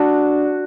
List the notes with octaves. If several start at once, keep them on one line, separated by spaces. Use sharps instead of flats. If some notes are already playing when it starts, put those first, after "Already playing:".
Already playing: D4 F#4